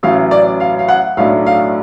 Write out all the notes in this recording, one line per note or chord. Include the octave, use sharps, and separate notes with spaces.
A1 A2 F#3 C#4 F5
D5
F5
F5
F#5
B1 A2 F#3 A3 D4 F5
F5